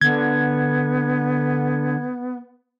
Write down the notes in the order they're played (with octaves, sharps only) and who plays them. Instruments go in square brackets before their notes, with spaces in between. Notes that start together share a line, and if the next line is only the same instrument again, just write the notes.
[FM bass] D3 [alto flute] B3 [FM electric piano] G#6